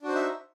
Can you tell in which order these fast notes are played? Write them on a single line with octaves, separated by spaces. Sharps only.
D4 F#4 C5 D#4 E5